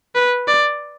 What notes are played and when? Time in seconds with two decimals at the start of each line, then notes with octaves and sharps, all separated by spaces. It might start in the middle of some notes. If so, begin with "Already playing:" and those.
0.15 B4
0.48 D5